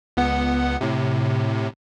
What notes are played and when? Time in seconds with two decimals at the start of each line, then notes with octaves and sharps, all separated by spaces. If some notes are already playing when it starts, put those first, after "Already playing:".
0.17 C#2 B3 F#5
0.81 A2 C3